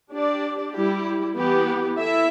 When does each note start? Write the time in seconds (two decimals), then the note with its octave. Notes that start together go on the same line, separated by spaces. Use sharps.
0.13 D4 G4 D5
0.74 G3 E4 G4
1.37 E3 B3 G4
1.99 E4 A4 E5